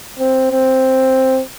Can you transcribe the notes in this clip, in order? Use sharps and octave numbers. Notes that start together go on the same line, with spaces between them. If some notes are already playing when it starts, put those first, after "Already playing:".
C4
C4